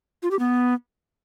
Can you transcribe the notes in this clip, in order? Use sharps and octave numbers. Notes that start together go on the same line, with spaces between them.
F4
G4
B3